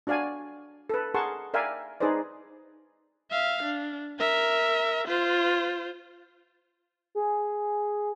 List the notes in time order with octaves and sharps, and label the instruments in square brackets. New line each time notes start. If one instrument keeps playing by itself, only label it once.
[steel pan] D4 F#4 D5 F5 G#5
A4 B4
G#4 A#4 F#5 A5 C6 C#6
A#4 D5 E5 F5 G5 G#5
D#4 G#4 B4 C5 D5
[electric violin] E5 F5
D4
A#4 E5
F4 C5
[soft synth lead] G#4